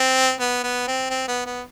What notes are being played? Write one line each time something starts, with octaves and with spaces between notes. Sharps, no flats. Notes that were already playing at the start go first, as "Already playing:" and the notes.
Already playing: C4
B3
B3
C4
C4
B3
B3